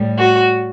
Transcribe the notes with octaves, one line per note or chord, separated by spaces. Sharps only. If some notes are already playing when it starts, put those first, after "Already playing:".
Already playing: A2 G3
F#4